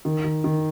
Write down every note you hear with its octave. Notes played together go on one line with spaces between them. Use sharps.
D#3
D#3
D#3